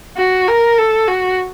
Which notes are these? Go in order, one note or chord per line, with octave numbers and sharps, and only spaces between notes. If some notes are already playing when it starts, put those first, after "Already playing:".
F#4
A#4
A4
F#4